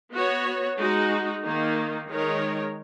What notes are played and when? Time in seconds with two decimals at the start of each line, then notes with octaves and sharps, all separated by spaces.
0.13 B3 F#4 C#5
0.77 G#3 D#4 F#4
1.43 D#3 A#3 D#4
2.08 D#3 G#3 D#4 A#4 C#5